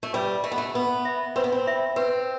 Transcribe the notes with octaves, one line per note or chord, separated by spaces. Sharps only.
A3
G3 B4
A3 E5 B5
B3
A3
B3 B4
E5 B5
C4 B4
B3
C4
E5 B5
C4 B4